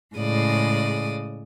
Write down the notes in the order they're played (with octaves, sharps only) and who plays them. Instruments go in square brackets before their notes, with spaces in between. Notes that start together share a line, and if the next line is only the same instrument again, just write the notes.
[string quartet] A2 C#3 G#3 D5 D#6